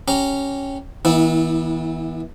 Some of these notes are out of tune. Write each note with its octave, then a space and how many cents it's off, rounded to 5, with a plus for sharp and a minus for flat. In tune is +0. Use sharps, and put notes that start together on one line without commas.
C#4 +0 G4 -15 A#5 +0
E3 -40 B3 -40 E4 -10